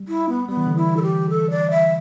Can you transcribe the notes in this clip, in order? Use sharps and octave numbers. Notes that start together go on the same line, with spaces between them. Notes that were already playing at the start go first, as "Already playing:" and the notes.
Already playing: G3
E4
B3
G3 B3
E3
D3
E3 E4
A4
G4
A4
D5
E5